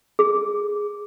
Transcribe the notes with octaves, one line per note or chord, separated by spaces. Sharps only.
G#4